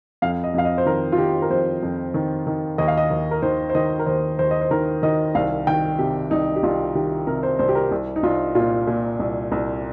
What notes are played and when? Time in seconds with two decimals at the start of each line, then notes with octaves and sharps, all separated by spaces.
0.22 F2 F5
0.44 D#5
0.54 F2 F5
0.65 D#5
0.78 C5
0.86 D#3 A#4
1.12 F4
1.18 D#3 G4
1.42 A#4
1.50 F2 C5
1.83 F2
2.14 D#3
2.47 D#3
2.78 D#2 D#5
2.88 F5
2.97 D#5
3.11 D#2
3.31 A#4
3.42 D#3 C5
3.70 C5
3.75 D#3 D#5
3.99 A#4
4.06 D#2 C5
4.39 D#2 C5
4.51 D#5
4.61 C5
4.71 D#3 A#4
5.03 D#3 D#5
5.35 C2 F5
5.67 D#3 G5
5.99 C3 G4
6.31 C2 D#4
6.56 G4
6.63 C2 F4
6.95 D#3 G4
7.27 C3 A#4
7.43 C5
7.59 C2 C5
7.69 G4
7.75 A#4
7.91 C2
8.16 D#4
8.23 C2 F4
8.55 A#2 F4
8.87 A#2
9.20 C2
9.52 C2